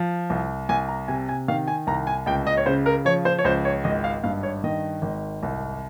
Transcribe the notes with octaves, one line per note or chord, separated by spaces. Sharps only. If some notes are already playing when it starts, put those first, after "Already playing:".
Already playing: F3
C2
C2 G#5
A#5
C3 G#5
G#5
D#3 F5
G#5
C2 A#5
G#5
C#2 G5
D#5
C#5
C#3 C5
A#4
F3 C#5
C5
C#5
C#2 C5
C#5
G#1 D#5
F5
G2 F5
C#5
D#3 D#5
G#1
C2